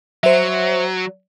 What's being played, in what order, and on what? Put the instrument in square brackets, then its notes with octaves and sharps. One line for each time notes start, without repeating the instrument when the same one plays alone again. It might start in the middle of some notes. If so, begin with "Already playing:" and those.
[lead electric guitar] F#3 [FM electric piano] C5 E5